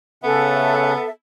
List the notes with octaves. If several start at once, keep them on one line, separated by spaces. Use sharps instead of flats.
C#3 B3 C#4 A4 E5 F#5